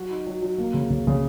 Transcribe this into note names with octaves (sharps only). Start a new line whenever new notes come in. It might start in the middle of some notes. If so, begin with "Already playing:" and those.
Already playing: F#3 F#4
D#4
F#3
F#3
A#3
C#3
C#3
C#3